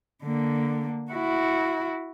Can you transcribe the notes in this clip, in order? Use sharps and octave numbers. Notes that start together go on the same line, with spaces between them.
D3 A#3
E4 F#4